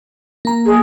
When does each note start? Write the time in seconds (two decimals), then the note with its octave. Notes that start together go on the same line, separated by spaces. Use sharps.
0.45 A#3 A#5
0.66 G#4